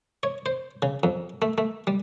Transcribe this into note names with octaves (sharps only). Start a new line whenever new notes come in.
C#5
C5
C#3
F2
A3
A3
G3